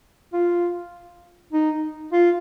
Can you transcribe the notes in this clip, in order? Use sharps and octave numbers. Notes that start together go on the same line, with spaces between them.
F4
D#4
F4